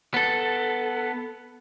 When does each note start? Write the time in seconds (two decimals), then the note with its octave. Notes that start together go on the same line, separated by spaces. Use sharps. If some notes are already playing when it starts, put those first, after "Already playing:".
0.14 B3 A4